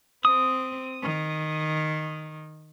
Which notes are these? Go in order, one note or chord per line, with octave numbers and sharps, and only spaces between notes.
C4 D#6
D#3